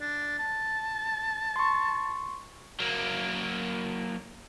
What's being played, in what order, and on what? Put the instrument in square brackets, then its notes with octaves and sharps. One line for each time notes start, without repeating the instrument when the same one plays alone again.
[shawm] D4
A5
[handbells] C6 C#6
[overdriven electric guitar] F#3 A#3